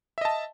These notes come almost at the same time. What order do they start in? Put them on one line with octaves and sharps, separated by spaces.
E5 D#5 A5